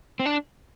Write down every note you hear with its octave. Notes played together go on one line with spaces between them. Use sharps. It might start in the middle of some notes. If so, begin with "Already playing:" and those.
C4
D4